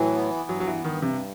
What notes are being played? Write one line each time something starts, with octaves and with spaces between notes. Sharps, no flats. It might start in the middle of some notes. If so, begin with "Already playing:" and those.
Already playing: A2 E3 F#3
B3
G2 F#3
F#3
E3
G2 D#3
C3